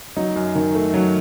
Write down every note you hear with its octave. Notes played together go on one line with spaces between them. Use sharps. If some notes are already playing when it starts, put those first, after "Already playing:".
F#3 D#4
F#2
D#3
A3
F#3